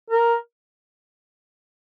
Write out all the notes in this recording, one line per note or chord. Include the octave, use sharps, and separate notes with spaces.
A#4